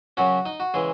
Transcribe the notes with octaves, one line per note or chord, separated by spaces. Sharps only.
F#2 C#3 F#3 C#4 F#4 F#5
D#4 D#5
F#4
C#3 E3 G#3 G#4